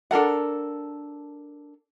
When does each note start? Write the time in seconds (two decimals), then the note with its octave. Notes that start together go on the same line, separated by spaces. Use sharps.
0.11 D4 A4 A#4 F#5